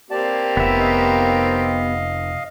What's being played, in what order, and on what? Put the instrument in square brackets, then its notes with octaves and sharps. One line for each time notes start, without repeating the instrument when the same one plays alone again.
[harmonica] A#3 C4 G4 [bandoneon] D5 A5
[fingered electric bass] F1 [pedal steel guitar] B3 E5
[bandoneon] D#5 F5